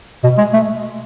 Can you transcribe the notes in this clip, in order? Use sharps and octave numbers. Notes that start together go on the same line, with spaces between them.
B2
G#3
A3